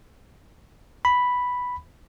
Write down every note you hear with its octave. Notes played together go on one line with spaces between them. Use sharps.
B5